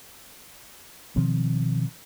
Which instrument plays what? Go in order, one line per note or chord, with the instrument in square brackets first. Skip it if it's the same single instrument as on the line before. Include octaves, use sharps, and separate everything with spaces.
[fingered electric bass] B2 D#3 F3 C4